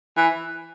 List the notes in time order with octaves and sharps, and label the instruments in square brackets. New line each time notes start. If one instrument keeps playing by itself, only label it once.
[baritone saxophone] E3